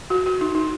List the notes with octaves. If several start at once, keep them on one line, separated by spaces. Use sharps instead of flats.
F#4
F#4
D#4
D#4